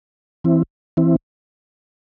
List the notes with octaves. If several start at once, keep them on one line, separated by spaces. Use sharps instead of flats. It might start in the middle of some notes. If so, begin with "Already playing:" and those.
E3 C4 E4
E3 C4 E4